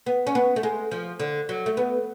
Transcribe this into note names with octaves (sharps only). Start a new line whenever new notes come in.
B3
C#4
B3
A3
G#3
F3
D3
F#3
A3
B3